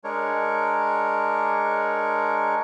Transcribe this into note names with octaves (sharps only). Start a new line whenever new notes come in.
G#3 D4 A#4 C#5